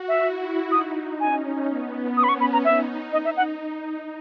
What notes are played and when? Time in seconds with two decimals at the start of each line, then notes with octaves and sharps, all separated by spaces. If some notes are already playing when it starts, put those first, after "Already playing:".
Already playing: F#4
0.08 E5
0.24 E4
0.72 D#4 D#6
1.20 C#4 G#5
1.69 B3
2.17 C#4 D#6
2.24 B5
2.29 C#6
2.40 B5
2.53 A#5
2.65 D#4 E5
3.12 D#4 D#5
3.25 E5
3.37 F#5